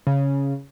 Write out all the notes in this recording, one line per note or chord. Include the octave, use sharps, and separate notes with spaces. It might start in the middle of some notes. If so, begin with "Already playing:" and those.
C#3